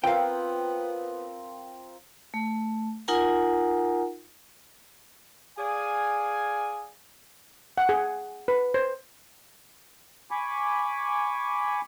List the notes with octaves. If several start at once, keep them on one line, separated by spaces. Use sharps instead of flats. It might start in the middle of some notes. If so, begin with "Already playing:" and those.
B3 C4 F4 A#4 F5 G5
A3
D#4 F4 A#4 F#5 G#5 A#5
G#4 D5 F5 G#5
F#5
G#4
B4
C5
G#5 B5 C#6 D6